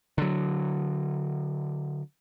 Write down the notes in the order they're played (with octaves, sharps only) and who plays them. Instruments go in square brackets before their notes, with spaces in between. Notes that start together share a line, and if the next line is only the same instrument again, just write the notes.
[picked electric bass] D3 F#3